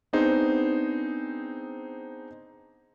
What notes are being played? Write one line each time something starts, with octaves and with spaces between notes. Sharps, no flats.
B3 C4 D4 D#4 G#4 C5